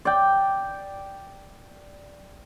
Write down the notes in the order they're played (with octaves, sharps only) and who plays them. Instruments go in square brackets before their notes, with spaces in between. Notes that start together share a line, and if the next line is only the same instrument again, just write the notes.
[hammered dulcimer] D5 G5